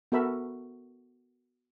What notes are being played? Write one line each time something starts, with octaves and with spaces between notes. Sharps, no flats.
B3 F#4 A4 A#4 E5 B5